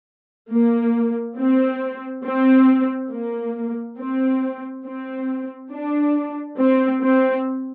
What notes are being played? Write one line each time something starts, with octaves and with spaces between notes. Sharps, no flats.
A#3
C4
C4
A#3
C4
C4
D4
C4
C4